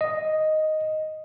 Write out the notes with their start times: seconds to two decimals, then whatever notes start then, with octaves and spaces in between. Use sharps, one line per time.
0.01 D#5